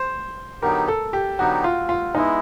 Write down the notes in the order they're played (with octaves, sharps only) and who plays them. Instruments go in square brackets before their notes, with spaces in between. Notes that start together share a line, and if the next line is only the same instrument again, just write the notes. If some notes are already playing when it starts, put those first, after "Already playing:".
Already playing: [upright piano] C5
[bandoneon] D3 F#3 B3 D#4 G4 [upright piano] A#4
[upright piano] A4
G4
[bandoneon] D3 F#3 B3 D#4 G4 [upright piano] F#4
[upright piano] F4
F4
[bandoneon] G#3 B3 E4 [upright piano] D#4